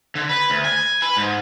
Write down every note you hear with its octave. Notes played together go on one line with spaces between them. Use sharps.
D3
B4
D2
G#5
B4
G#2